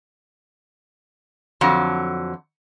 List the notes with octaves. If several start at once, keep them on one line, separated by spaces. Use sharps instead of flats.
F2 D3 F#3